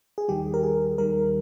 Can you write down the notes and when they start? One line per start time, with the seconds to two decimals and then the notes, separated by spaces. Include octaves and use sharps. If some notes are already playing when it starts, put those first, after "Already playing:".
0.18 G#4
0.28 D#2 D#3 G3 G4
0.54 A#4
0.63 G#4
0.98 D#2 D#3 G3 A#4